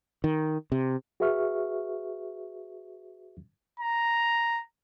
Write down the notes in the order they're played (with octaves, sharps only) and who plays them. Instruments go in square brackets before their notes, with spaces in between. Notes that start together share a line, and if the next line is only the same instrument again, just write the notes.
[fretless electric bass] D#3
C3
[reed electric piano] F#4 G#4 B4 E5 C#6 F6
[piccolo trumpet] A#5